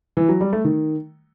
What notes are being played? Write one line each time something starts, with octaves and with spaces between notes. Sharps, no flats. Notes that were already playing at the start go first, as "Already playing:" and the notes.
E3
F#3
G3
A3
D#3